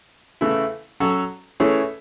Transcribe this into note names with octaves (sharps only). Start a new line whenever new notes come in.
C#3 E3 A3 E4
F#3 C#4 F#4 A4
E3 A3 C#4 G#4 C#5